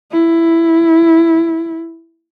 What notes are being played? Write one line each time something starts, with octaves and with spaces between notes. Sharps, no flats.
E4